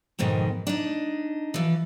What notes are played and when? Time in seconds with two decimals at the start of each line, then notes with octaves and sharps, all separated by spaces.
0.19 F2 G#2 B2 D#3
0.67 D4 D#4
1.54 E3 F3